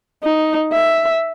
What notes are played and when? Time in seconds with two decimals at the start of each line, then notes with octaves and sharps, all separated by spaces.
0.24 D#4
0.72 E5